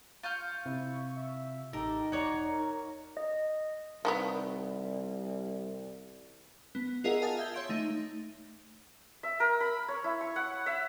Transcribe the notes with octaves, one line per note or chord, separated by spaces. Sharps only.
F4 C#6 F6 G6
C3 E4
E5
A1 D#4 G4 A4 A#4
E1 F#4 C#5 D5 A#5
A#4
D#5
C2 D#3 F3 B3
B3
F4 G#4 A#4 D#5 E5 F#5
D#5 F5 G#5 A5 D#6 A6
E5 G6 G#6 G7
C#5 E5 C6 G6 D7
A3 D#4
E5
A#4
B5
C#5
E4
C#6
F#5
E5